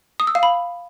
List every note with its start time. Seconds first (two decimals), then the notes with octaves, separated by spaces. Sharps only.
0.20 D#6
0.27 E6
0.35 F5
0.43 B5